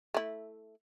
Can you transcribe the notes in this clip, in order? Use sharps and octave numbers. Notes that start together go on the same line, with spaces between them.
A3 E4